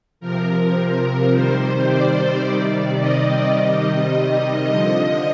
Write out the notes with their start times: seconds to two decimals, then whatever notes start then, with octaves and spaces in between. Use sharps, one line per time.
0.21 C3 F3 A#4
0.76 A#4
1.32 C3 D#3 G3 C5
1.88 D5
2.44 C3 D#3 G3
2.99 D#5
3.55 C3 D#3 G3 D#5
4.67 D3 F3 D#5